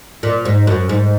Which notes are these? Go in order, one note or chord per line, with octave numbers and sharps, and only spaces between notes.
A#2
G#2
F#2
G#2